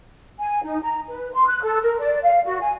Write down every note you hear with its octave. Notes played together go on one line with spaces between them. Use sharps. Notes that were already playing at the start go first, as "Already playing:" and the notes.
G#5
D#4
A#5
B4
C6
F#6
A4
A#4
D5
F5
F#4
G#5